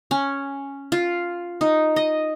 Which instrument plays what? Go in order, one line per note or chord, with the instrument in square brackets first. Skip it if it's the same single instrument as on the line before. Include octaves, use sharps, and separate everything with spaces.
[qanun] C#4
F4
D#4
D#5